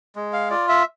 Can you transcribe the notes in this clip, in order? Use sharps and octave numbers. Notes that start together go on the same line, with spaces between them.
G#3
F5
F4 D5
E5